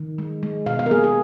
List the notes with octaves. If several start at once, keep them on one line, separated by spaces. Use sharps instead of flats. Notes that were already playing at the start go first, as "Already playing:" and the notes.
Already playing: D#3
G#3
G#3
B2 F5
F5
A#4
A#3 G#4
G#4